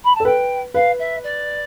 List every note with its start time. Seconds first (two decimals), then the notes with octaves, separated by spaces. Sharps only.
0.04 B5
0.15 A5
0.20 A4
0.25 B4 G5
0.74 B4 F5
0.99 E5
1.23 D5